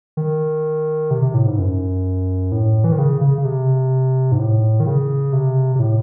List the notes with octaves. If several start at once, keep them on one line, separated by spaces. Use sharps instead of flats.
D#3
C3
C3
A2
G#2
F#2
A2
E3
D#3
C#3
C#3
C#3
C3
G#2
A2
D#3
C#3
C3
C3
A2